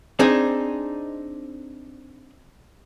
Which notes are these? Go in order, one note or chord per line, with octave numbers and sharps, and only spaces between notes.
C4 D4 D#4 G#4 G#5